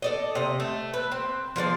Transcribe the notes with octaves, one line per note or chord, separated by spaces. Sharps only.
A4 D5 D#5
C3 D#5
A3
B4
C4
F3 G#3 A#4 D5